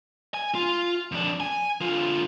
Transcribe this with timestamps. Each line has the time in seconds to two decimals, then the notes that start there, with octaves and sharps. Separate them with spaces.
0.34 G#5
0.55 F4
1.12 F2 D4
1.40 G#5
1.81 D3 F4